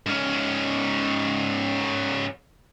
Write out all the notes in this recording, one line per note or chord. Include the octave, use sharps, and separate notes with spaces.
G#2 C#4